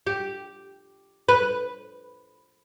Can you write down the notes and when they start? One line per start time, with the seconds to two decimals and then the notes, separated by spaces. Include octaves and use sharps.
0.07 G4
1.29 B4